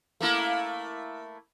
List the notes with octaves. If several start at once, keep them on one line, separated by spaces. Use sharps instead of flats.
A3 A#3 E4